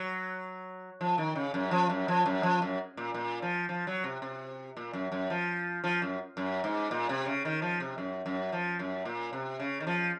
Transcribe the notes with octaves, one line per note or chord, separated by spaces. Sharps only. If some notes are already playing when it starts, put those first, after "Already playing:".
Already playing: F#3
F3
D#3
C#3
F#2
F3
F#2
F3
F#2
F3
F#2
A#2
A#2
F3
F3
F#3
C3
C3
A#2
F#2
F#2
F3
F3
F#2
F#2
G#2
A#2
C3
C#3
D#3
F3
C3
F#2
F#2
F3
F#2
A#2
C3
C#3
D#3
F3